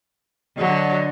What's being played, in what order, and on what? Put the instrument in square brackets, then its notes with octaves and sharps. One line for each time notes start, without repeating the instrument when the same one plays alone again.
[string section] D3 [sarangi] F#3 [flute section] F#4 D#5